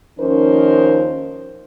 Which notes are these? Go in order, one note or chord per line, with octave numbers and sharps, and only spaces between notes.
D#2 F3 C#4 D#4 A#4 C5